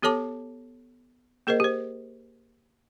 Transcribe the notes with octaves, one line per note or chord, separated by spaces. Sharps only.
B3 G4 A4 C#5 A5 D6
A#3 G#4 A#4 C5 D#5
G4 C5